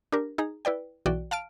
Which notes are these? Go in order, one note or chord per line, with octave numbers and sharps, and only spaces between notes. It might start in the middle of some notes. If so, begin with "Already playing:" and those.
D4 G4 A#4
D#4 G#4 A#5
E4 B4 D5 G5
B1 E3 F#4 D5 G5
F5 A5 F6 D7